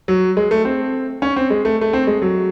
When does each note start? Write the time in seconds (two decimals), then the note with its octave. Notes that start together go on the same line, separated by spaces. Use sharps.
0.08 F#3
0.37 G#3
0.51 A3
0.65 C4
1.22 C#4
1.36 C4
1.50 G#3
1.65 A3
1.81 A3
1.93 C4
2.07 G#3
2.22 F#3